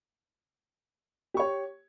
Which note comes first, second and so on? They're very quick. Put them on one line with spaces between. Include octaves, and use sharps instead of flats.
G4 C#6 C#5